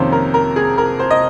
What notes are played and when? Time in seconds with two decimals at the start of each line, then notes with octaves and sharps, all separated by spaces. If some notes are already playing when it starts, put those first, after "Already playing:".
Already playing: F2 C3 D#3 A#3 C#4 C5
0.12 A#4
0.34 A#4
0.56 G#4
0.78 A#4
0.99 C5
1.11 D#5